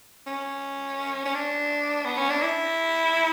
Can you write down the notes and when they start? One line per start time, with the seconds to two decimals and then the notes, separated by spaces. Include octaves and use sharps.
0.27 C#4
1.25 C#4
1.34 D4
2.05 B3
2.18 C#4
2.30 D4
2.42 E4